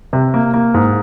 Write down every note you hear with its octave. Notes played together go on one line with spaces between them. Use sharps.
C3
A#3
A#3
G#2